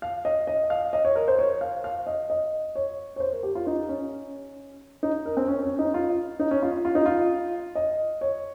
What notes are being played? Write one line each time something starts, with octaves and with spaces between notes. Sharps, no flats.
F5
D#5
D#5
F5
D#5
C#5
A#4
C5
C#5
F5
F5
D#5
D#5
C#5
C#5
C5
A#4
G4
F4
D#4
C#4
D#4
A#4
C4
C#4
C#4
D#4
F4
D#4
C#4
F4
F4
D#4
F4
D#5
C#5